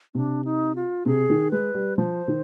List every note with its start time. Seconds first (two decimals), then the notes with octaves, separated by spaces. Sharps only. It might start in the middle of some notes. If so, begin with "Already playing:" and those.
0.15 C3 D4
0.45 D#4
0.75 F4
1.06 C3 G#4
1.30 D#3
1.51 G#3 B4
1.74 G3
1.97 F3 C5
2.28 D#3